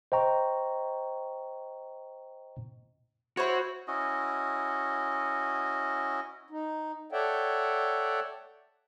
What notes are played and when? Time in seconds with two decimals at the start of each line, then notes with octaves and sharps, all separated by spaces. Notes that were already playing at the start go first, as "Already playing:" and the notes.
0.12 C5 D#5 G5 A#5 C#6
3.37 E4 F#4 C5 C#5
3.88 C#4 E4 F#4 D#5
6.50 D#4
7.12 A4 C#5 D5 E5 F#5 G5